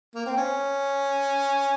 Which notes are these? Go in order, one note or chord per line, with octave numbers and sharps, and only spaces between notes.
A#3
C4
C#4